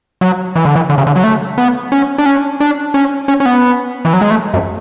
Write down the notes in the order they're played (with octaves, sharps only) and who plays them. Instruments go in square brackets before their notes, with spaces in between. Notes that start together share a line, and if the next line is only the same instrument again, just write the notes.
[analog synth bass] F#3
E3
D3
E3
D3
C#3
D3
F#3
A3
B3
C#4
D4
C#4
D4
C#4
C#4
C#4
B3
E3
F#3
G#3
A3
F#2